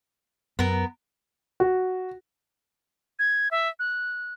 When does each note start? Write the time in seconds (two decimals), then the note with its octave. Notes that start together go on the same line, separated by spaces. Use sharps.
0.59 F#2 B3 A#4
1.60 F#4
3.19 G#6
3.51 E5
3.79 F#6